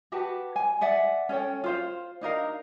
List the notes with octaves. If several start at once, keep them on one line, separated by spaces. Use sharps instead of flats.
F#4 G4 B4 A5
G#5
D5 E5 F#5 G#5
C#4 A4 C#5 G5
F4 C5 F5
D4 D#4 A#4 F5